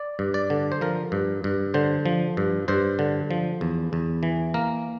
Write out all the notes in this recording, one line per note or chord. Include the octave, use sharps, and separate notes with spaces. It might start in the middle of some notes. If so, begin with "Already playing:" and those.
Already playing: D5
G2
D5
D3
C5
F3 A#4
G2
G2
D3 C5
F3
G2
G2 C5
D3
F3
E2
E2
E3
A#3 A#4